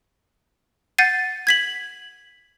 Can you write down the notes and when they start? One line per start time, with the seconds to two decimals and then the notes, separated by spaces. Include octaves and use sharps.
0.98 F#5 G6 A6 C7 D#7
1.47 G#6 B6 F#7